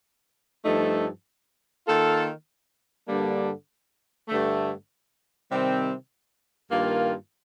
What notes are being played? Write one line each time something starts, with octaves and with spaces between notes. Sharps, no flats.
G2 F3 A3 D#4 A4
D#3 A#3 F4 A4
G2 D3 G3 A#3 D4
G2 D3 A3
C3 D#3 G3 C4
G2 D#3 A#3 F4